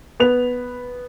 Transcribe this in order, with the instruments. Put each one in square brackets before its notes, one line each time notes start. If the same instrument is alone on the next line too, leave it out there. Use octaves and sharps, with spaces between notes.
[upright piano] B3 B4 F7